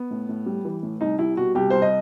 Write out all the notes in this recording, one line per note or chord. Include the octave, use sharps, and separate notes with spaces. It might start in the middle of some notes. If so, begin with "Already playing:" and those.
Already playing: B3
A2
A2
G3
E3
A2
C2 D#4
G3 E4
B2 F#4
C2 G4
C2 C5
D#5